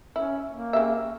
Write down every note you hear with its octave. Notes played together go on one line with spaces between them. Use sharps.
C#4 E4
A#3
C#3 G4 E5